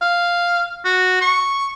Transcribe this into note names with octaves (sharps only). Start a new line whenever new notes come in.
F5
F#4
C#6